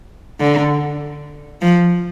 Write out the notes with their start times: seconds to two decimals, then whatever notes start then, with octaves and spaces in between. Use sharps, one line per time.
0.40 D3
1.62 F3